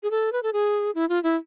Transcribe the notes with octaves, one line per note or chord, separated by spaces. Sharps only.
G#4
A4
B4
A4
G#4
E4
F4
E4